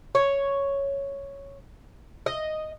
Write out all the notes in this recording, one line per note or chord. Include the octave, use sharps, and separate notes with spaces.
C#5
D#5